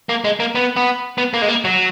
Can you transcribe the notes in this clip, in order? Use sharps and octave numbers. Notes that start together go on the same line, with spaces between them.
A#3
G#3
A#3
B3
B3
B3
A#3
G#3
A#3
F#3